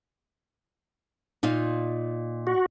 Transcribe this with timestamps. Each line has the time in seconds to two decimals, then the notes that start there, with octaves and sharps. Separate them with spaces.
1.43 A#2 D#4 F4
2.47 F#4